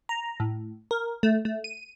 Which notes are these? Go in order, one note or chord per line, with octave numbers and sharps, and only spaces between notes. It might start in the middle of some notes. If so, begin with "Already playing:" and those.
A#5
A2
A#4
A3
A3
D#7